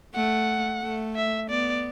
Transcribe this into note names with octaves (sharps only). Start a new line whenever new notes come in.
A3 F#5
A3
E5
B3 D5